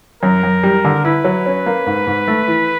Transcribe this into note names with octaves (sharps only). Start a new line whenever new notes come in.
F#2 A#4
F#2
G3
D3
E4 B4
F#3
C#4
A#3
G#2
G#2
A3
E3